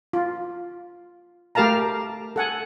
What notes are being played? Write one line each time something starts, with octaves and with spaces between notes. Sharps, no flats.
F4
A3 G4 A#4 F5 A5 A#5
A4 F#5 G#5